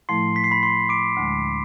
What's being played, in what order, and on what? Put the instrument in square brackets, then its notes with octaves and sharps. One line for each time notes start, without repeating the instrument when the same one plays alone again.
[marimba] A2 F3 A3 E4 [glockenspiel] C6 C7
[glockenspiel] B6
C7
B5 B6
C6 C7
D6 D7
[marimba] D2 D3 G#3